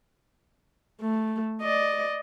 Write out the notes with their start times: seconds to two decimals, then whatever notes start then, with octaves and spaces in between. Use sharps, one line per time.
1.01 A3
1.62 D5 D#5